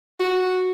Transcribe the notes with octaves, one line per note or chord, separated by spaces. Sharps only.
F#4